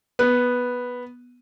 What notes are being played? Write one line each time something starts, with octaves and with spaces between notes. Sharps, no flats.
B3